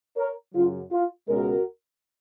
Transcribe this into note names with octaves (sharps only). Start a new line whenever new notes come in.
A#4 C#5
F#2 C#3 F#3 C#4 F4
F4
C#2 B2 G#3 C#4 F#4 A#4